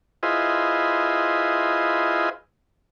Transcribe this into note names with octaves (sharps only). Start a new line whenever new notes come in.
E4 F4 G#4 B4 C5 D#5